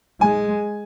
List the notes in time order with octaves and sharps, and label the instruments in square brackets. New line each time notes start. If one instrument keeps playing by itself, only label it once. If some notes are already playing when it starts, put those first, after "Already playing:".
[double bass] G#3 [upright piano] G#5